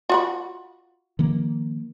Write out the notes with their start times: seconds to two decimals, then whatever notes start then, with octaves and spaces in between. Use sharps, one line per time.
0.10 F4 F#4 B5
1.19 D#3 F3 A#3